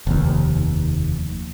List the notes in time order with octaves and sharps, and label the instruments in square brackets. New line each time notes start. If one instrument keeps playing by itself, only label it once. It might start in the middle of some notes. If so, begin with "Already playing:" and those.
[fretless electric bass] F1 D#2